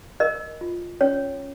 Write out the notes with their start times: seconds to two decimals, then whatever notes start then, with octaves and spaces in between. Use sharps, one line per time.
0.20 A#4 D#5
0.61 F4
1.01 C#4 C#5